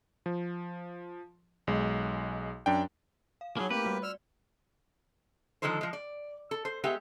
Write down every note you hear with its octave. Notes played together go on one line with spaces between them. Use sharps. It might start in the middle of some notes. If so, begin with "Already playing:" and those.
F3
B1 G#3
F#2 D4 G5
F5
F#3 A#3 D#4 G#4 A5 B5
A3 A#3 C4 G4 B4
G3 F#4
D5 E6 F6
D3 D#3 F3 G#3 A4 C5
F3 G#3
D5
A4
C5
G#3 B3 G4 E5 F#5